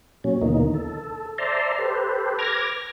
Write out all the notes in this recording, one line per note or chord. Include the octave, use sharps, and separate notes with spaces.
A#2 F#3 C#4
D#2 B2 D3 E3 A#3 D#4
A4
C5 D5 E5 A5 A#5 C6
G4 A4 B4 C5
B4 D6 F6 G#6 A#6